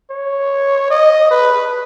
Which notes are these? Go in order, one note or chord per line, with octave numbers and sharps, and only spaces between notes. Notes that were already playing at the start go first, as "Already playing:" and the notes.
C#5
D#5
B4